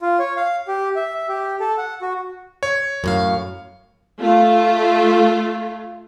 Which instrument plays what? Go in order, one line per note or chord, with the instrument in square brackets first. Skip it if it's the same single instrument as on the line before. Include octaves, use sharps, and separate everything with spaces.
[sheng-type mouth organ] F4
C#5
F5
G4
E5
G4
A4
F#5
F#4
[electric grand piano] C#5
[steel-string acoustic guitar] F#2 A2 F5
[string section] A3 F4